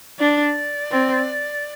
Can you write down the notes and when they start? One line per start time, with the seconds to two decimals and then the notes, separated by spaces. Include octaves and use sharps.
0.19 D4 D5
0.91 C4